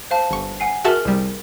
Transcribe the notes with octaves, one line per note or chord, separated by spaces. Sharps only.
C5 F5 A5
G1 C#6
F#5 G#5 C7
F#4 G#4 A#4 E5 A5 F6
C2 G3